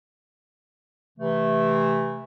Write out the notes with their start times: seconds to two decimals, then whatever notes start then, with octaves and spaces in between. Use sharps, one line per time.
1.18 C3 E3 A3